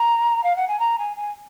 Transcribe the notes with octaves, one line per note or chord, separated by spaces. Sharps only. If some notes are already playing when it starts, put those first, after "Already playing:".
Already playing: A#5
F5
F#5
G#5
A#5
G#5
G#5